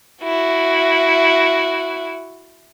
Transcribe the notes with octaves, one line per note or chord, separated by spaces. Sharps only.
E4 F#4